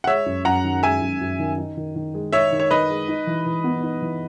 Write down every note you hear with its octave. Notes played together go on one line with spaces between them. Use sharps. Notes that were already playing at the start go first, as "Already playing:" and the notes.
F#5
G#3 C#5 E5
F#2
F#2 F#5 A#5
D#3
G#3 E5 G#5
F#2
F#2
D#3
D#4
D#3
D#3
G#3
D#4 C#5 E5
D#3
C#5
D#3 B4 D#5
G#3
D#4
E3
E3
B3
D#4
E3